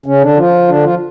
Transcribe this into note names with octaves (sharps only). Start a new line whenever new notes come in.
C#3 C#4
D3 D4
F3 F4
D3 D4
F3 F4